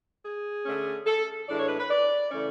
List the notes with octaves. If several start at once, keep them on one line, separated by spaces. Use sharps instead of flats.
G#4
D3 A3 C#4
A4
A2 E3 G#3 D4 D5
C#5
B4
B4
D5
C#3 E3 A3 C#4 D5